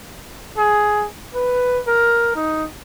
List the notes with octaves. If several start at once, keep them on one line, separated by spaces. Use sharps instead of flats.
G#4
B4
A#4
D#4